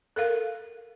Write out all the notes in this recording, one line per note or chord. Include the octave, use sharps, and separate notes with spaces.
A4 A#4 F5